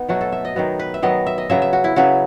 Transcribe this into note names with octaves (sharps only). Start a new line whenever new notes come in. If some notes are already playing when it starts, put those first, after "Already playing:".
Already playing: B3 D#4
B2 F#3 A3 F#4
A4
E5
D#5
D#3 F#3 B3
B4
E5
D#3 F#3 B3 D#5
E5
D#5
C#3 F#3 B3 E5
E5
F#4
E4
C#3 F#3 B3 F#4